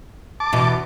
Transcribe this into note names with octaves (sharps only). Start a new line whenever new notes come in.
A5 D6
E2 B2